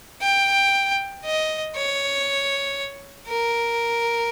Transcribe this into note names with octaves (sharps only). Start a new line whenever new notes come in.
G5
D#5
C#5
A#4